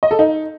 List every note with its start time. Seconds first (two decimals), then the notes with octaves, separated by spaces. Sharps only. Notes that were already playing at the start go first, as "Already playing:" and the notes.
0.03 D#5
0.11 A4
0.19 D#4